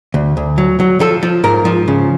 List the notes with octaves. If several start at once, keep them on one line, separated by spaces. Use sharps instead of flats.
D2
D2
F#3
F#3
F3 A4
F3
G#2 A#4
F3
C#3